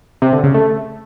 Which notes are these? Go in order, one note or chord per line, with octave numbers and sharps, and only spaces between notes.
C3
D3
C#3
A3